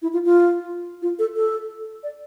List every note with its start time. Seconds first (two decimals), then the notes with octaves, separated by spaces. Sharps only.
0.02 E4
0.13 F4
0.25 F4
1.02 F4
1.19 A4
1.36 A4
2.03 D5